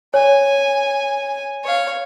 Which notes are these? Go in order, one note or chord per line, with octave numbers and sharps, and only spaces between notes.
C#5 G#5
C#5 F5